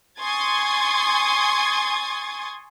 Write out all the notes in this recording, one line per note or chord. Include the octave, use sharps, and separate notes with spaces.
G#5 C6 C#6 D#6 G#6 A6